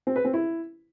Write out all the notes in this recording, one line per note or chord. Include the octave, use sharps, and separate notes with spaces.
C4
B4
C4
E4